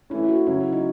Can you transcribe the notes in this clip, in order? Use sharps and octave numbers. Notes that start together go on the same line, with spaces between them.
E3 A3 C#4 E4
F#4
C#3 F#3 C#4 E4 F#4
D#4